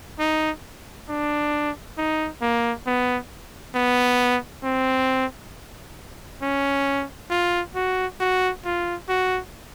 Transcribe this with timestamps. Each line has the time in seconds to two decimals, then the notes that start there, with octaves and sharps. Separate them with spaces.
0.20 D#4
1.09 D4
1.98 D#4
2.42 A#3
2.87 B3
3.75 B3
4.64 C4
6.43 C#4
7.30 F4
7.76 F#4
8.20 F#4
8.65 F4
9.09 F#4